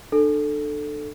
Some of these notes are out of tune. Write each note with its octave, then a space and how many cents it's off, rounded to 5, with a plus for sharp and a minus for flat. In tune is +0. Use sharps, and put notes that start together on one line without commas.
D4 +35 A4 +0